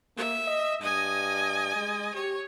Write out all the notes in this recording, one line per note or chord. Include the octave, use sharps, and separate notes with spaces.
A#3 E5
D#5
G2 D#5 G#5
G#3
G4 C#5